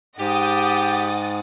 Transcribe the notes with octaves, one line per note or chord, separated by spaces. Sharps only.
G#2 G4 D#5 F#5 G5 D#6 A6